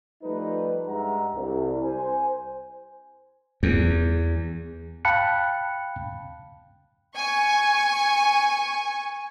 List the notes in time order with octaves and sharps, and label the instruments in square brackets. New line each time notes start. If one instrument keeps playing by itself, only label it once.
[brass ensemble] F3 G3 A3 D#4 B4
G2 G#3 E5 F#5 A#5
C2
C5 G#5
[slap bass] E2
[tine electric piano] F5 G5 A5 B5 F#6 C#7
[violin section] G#5 C#6